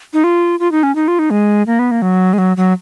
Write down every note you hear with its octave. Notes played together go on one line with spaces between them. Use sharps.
D#4
F4
F4
D#4
C#4
D#4
F4
D#4
G#3
A#3
B3
A#3
F#3
G#3
F#3
F#3